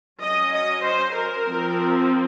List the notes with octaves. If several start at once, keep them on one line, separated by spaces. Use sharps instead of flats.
F#3 C#4 D#5
D#5
C5
A#4
F3 C4